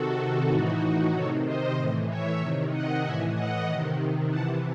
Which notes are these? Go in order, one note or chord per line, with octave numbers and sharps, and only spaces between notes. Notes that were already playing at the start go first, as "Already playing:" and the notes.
Already playing: C3 D#3 F#4 A4
A2 E3 D#4 F#4
C3 D#3 A4 C#5
C5 D#5
A2 E3
C#5 E5
C3 D#3
D#5 F#5
A2 E3 E5 G#5
D#5 F#5
C3 D#3
C3 E3 F#5 A5